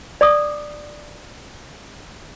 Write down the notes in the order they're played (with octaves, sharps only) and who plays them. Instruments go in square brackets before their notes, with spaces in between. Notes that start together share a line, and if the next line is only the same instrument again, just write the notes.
[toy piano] D5 D6 D#6